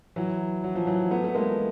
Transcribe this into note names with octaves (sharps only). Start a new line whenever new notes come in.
E3 F#3
F#3
F3
E3 F#3
A3 B3
A3
G#3 A#3